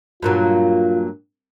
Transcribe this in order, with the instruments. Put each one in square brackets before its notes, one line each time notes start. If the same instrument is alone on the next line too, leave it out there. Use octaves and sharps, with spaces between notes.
[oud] G2 A#2 F#3 [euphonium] F4